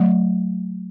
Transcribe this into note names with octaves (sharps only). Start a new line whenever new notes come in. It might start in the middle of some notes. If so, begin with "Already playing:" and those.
Already playing: F#3 A3